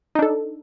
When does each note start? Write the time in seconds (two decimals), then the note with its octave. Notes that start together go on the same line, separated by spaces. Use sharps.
0.15 D#4
0.19 D4
0.22 A4